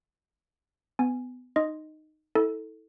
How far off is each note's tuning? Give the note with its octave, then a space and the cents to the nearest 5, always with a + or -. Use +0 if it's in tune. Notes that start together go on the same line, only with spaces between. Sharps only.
B3 +25 G#5 -5
D#4 -10 D#5 +0 C6 +0
E4 -35 A4 +0